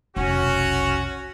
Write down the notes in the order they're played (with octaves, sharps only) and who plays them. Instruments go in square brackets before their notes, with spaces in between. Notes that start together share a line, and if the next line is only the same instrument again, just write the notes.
[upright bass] F1 B1 [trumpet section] C#4 F#4